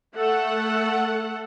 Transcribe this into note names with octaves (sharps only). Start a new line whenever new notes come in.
A3 A4 F#5